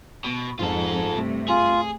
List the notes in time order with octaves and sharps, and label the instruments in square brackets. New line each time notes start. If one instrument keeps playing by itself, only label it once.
[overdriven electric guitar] B2
[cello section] F2 [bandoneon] G#2 [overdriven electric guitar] F4 A4
[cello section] G2 C3 A3
[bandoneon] F4 [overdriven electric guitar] G#4